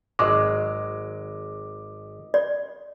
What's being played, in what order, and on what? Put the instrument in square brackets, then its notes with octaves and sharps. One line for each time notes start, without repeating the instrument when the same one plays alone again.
[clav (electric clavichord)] G#1 F#3 G#3 [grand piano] D#5 D6
[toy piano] D5